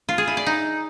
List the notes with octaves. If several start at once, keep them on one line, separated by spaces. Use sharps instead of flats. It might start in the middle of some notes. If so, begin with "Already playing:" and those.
F4
G#4
E4
D5
D#4